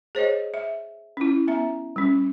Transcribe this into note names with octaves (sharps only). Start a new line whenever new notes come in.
G#4 C5 C#5 D#5
E5
C#4 E4
B3 E5 A#5
G3 C#4